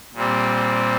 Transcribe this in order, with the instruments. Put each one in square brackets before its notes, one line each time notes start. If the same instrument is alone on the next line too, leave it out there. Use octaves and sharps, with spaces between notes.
[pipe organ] A#2 G3 C4